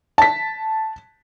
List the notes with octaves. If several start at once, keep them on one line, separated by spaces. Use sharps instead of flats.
A5 B6